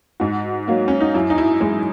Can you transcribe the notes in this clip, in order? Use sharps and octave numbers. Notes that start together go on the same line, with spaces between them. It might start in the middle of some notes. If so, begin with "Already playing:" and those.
G#2 F#4
F#3 A#3
C#4
D#4
F#2 E4
D#4
E4
E3 G#3 E4